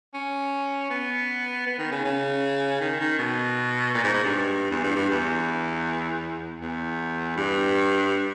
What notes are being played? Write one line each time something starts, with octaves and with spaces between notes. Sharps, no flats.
C#4
B3
B3
D#3
C#3
C#3
D#3
D#3
B2
A#2
G#2
G#2
G2
E2
G2
G2
E2
E2
G2